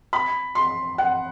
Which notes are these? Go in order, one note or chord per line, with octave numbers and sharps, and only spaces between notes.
B5
C6
F#5